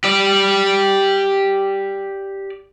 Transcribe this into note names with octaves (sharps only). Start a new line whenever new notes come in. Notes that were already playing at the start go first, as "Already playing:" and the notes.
G4 D5